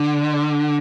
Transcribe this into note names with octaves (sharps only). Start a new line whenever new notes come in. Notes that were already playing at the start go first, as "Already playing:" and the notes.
Already playing: D3